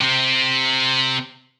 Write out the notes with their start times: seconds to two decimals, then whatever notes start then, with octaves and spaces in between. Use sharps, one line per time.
0.01 C3 C4